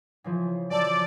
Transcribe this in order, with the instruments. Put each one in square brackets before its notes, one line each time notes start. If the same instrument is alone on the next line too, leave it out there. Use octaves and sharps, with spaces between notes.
[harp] C#3 E3 F3
[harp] F#2 A5 E6 [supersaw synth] D5